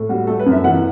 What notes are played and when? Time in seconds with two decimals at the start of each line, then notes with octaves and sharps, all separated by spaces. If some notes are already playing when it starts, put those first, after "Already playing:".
Already playing: A2
0.09 G3 F#4
0.27 A3 A4
0.39 B4
0.46 F#2
0.52 E5
0.64 E3 F#5